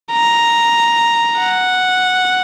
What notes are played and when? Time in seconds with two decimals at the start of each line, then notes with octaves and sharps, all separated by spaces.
0.13 A#5
1.39 F#5